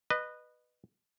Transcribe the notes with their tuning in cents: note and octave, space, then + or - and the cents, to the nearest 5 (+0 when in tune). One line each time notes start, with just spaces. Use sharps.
B4 +0 D#5 -25